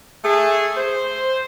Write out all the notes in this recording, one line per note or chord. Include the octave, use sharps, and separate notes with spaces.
A3 G#4
C5